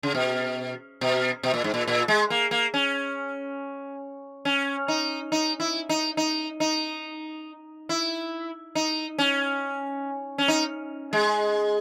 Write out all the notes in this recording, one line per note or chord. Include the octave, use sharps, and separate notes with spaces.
C#3
B2
B2
B2
A#2
G#2
A#2
A#2
G#3
A#3
A#3
C#4
C#4
D#4
D#4
E4
D#4
D#4
D#4
E4
D#4
C#4
C#4
D#4
G#3